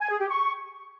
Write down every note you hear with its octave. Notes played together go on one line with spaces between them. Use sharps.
G#5
G#4
G4
C#6